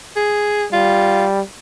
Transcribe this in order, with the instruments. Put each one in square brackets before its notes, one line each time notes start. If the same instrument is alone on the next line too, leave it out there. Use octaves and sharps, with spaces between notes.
[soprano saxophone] G#4
[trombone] G3 [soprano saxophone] F4